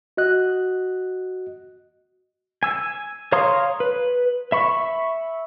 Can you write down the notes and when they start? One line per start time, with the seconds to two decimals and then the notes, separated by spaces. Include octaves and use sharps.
0.17 F#4 D#5 F#6
2.63 G#5 E6
3.32 C#5 F5 A#5 C6 D#6
3.80 B4
4.52 E5 B5 C#6